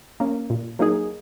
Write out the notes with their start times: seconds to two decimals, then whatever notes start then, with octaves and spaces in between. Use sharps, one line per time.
0.20 A#3 C#4
0.50 A#2
0.79 F#3 A#3 D#4 G#4